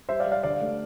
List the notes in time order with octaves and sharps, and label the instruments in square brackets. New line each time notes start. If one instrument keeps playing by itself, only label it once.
[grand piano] G3 C5 E5
D5 F5
G3
D5 F5
D3 D5 F5
A3